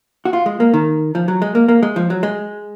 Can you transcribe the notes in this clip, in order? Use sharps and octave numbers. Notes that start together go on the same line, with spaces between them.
F#4
F4
G#3
A#3
D#3
F3
F#3
G#3
A#3
A#3
G#3
F3
F#3
G#3